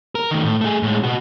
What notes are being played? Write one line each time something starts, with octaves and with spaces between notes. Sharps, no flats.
A#4
D#3 A3
A2
A3 G#4
A2 G#3
B2 F#4